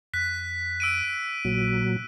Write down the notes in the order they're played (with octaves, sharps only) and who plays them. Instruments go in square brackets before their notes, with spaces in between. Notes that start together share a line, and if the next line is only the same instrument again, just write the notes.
[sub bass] F2 [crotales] F#6 B6
[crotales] E6 D7 D#7
[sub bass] A#1 [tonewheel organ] A#2 F#3